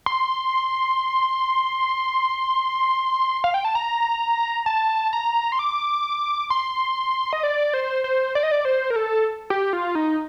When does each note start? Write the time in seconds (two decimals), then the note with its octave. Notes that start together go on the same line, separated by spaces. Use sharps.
0.06 C6
3.44 F5
3.54 G5
3.65 A5
3.75 A#5
4.66 A5
5.13 A#5
5.52 C6
5.59 D6
6.50 C6
7.33 D#5
7.43 D5
7.74 C5
8.04 C5
8.35 D5
8.43 D#5
8.52 D5
8.65 C5
8.90 A#4
8.96 A4
9.50 G4
9.73 F4
9.95 D#4